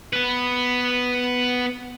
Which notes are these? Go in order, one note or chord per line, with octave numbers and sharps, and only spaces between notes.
B3 B4